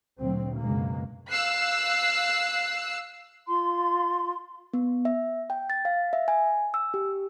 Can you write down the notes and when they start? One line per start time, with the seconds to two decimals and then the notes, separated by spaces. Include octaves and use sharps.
0.20 D2 A#2 F#3 C4
0.58 C#2 F#2 B2 G#3 A#3
1.29 F5 E6 F#6 C7
3.47 F4 C6
4.74 B3
5.05 E5
5.50 G5
5.70 A6
5.85 F5
6.13 E5
6.28 G#5
6.74 E6
6.94 G4